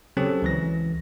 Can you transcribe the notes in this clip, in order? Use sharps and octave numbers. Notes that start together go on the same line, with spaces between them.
C#3 F#3 C4 C#4 G4 A4
C#2 E3 A#6